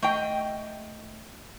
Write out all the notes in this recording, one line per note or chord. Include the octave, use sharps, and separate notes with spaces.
A3 D#5 G5